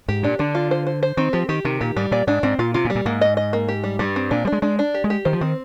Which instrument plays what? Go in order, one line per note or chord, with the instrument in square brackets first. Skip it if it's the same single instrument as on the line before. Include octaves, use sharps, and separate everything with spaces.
[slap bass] G#2 [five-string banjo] G4
[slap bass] A#2 [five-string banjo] D4
[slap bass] D3 [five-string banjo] D4
[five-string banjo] F4
C5
C5
C5
[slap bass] D#3 [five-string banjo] C4
[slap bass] F3 [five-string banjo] G4
[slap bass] D#3 [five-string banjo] G4
[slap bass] C3 [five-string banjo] D#3
[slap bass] A#2 [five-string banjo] G4
[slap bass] G#2 [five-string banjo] G3
[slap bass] A#2 [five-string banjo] D5
[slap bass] G#2 [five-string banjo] D4
[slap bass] G#2 [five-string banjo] C4
[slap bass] A#2 [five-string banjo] F4
[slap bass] C3 [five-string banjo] F4
[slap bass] A#2
[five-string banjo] G3
[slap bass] A#2
[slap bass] G#2 [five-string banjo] A#3
[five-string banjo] D#5
D#5
A#3
G4
G3
[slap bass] G2 [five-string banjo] G3
[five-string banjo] C4
[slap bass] A#2 [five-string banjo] D4
[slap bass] G3
[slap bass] G#3 [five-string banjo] D4
[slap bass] G#3 [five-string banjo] D4
[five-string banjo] D4
G4
[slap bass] G#3
[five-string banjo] G4
[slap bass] D#3 [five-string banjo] C5
[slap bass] F3
[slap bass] D#3 [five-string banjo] C4